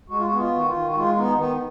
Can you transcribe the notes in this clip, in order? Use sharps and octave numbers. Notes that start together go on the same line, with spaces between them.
G#3 F#4
F4
F#4
B3
F4
D#3 F#4
F4
D#3
F#4
G#3 F4
B3 D#4
D#3 B3